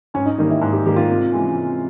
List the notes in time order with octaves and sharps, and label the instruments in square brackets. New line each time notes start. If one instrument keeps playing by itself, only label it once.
[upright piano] G#2 [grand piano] C#4
[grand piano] D#4
[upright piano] D#3 G3 A#3 [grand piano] D#4
[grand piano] E4
[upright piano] G#2
[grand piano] G4
[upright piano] D#3 G3 A#3 [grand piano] G4
[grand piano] F4
[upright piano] C3
E3 G#3 C#4
C3